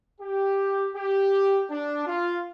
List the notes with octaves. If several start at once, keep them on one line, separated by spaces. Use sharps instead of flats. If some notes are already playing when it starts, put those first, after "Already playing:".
G4
G4
D4
F4